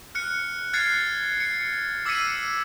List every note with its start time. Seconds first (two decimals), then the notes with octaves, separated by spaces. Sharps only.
0.15 F6 F#6 C#7
0.73 F6 F#6 G#6 A6 C7 C#7
1.40 C#7
2.05 D6 E6 G#6 B6 C#7 D#7